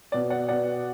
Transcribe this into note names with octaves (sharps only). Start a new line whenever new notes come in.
B2 B3 D5
D5 F#5
B2 B3 D5 F#5